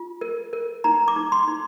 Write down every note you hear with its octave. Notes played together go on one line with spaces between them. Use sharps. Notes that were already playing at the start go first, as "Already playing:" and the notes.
Already playing: F4
A#4
A#4
D#4 A#5
D6
D#4
C6
D#4